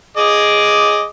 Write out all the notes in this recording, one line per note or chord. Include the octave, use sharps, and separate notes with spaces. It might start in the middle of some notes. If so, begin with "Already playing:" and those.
G#4 D#5 D6